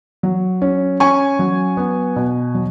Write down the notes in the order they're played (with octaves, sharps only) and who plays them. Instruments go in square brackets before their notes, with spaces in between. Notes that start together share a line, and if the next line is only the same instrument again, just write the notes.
[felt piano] F#3
C#4
C#4 G#5 C#6
F#3
B3
B2
F#3